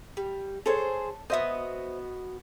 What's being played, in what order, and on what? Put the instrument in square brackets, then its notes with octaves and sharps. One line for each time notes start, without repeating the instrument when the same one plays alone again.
[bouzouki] G3
[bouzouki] G#4 C5 [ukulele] A4 C#5
[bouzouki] B3 F#4 D#5 [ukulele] C5 E5